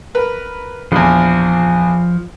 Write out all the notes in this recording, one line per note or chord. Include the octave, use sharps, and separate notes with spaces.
A#4 B4
A#1 E2 F3